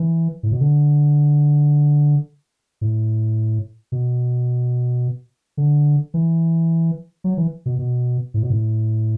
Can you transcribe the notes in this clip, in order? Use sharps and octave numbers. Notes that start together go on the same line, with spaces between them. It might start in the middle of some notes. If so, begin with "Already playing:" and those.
Already playing: E3
A2
B2
D3
A2
B2
D3
E3
F#3
E3
B2
B2
A2
B2
A2